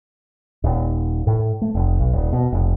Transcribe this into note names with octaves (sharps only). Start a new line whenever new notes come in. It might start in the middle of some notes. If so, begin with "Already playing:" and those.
D#1
A2
A3
F1
B1
D#1
B2
F1